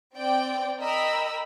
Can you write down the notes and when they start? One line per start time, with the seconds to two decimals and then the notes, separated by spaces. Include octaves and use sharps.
0.15 C4 D5 G5
0.79 A#4 D#5 G5 B5 E6